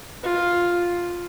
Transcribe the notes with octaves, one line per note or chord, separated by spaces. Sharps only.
F4